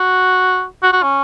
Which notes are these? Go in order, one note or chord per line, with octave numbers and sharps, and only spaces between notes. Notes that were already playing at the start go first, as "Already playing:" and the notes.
Already playing: F#4
F#4
F#4
C#4